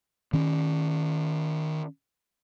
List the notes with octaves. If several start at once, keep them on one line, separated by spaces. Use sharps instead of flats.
D#3 C#4